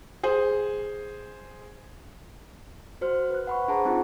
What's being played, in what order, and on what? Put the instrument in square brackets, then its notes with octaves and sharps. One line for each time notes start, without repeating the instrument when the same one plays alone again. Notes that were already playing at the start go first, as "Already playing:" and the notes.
[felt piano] G#4 C5
[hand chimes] F#4 C5 F6
B4 F#6
F#5 B5 C#6
D4 G#4 C5 F#5 A5 A#5
C4 D#4 F4 G4